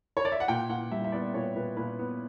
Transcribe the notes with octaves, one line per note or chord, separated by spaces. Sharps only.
C#5
D5
E5
F#5
A#2 G5
A#2 F#5
G3 E5
E5
B3 D5
A#2 C#5
A#2 B4
A#2 B4
B3